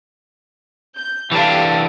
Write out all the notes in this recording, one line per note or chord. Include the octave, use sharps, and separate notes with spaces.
G6
E3 D4 G4 A4 F5